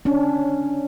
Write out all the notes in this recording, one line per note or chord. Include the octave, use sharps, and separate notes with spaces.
C#4 D4